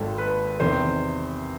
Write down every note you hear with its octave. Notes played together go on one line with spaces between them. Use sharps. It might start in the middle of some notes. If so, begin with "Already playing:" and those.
Already playing: G#1 G#2 D#3 A4
B4
E2 C3 D#3 C5